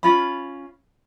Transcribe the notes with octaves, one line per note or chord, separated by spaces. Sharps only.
C#4 F4 B5